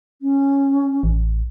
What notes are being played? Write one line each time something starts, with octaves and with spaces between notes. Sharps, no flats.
C#4
A1